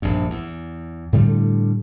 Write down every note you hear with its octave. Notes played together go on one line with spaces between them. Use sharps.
A#1 G2
E2
A2 D3 G3 A3